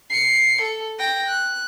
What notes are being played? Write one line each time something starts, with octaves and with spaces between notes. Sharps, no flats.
C7 C#7
A4
G5 A#6
F#6